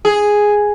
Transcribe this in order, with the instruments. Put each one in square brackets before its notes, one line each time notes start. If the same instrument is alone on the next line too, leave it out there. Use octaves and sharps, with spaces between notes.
[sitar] G#4